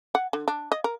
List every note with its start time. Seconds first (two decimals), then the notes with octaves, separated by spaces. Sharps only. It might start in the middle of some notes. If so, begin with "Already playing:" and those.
0.15 F#5
0.33 D3
0.48 D4
0.72 D#5
0.84 A#4